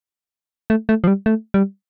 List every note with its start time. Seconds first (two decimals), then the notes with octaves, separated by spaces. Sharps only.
0.70 A3
0.89 A3
1.04 F3
1.07 G3
1.26 A3
1.54 G3